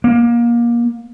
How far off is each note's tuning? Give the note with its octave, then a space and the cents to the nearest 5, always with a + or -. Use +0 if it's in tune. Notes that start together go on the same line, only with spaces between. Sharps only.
A#3 +25